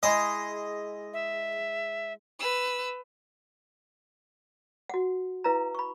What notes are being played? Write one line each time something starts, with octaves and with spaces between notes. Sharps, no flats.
G#3 E4 G#4 D#5
E5
B4 E6
F#4 F#5
E4 B4 F5 A#5
B5 C#6